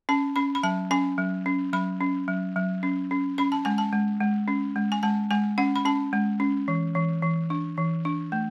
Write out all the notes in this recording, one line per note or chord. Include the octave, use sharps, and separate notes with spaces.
C#4 A5
C#4 B5
B5
F#3 A5
C#4 G#5
F#3
C#4
F#3 B5
C#4
F#3
F#3
C#4
C#4
C#4 B5
A5
G#3 G#5
A5
G#3
G#3
C#4
G#3
G#5
G#3 A5
G#3 G#5
C#4 F#5
B5
C#4 A5
G#3
C#4
E3
E3
E3
D4
E3
D4
A3